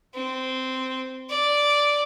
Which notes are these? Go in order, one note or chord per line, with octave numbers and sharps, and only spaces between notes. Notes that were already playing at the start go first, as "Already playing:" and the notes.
C4
D5